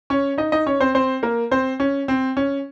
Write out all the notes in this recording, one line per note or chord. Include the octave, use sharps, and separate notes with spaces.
C#4 C#5
D#4 D#5
D#4 D#5
C#4 C#5
C4 C5
C4 C5
A#3 A#4
C4 C5
C#4
C4
C#4